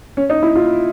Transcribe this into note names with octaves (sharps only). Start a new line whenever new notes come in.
C#4
D#4
E4
F4